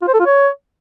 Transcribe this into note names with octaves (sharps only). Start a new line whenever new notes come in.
F4
C5
A4
F4
C#5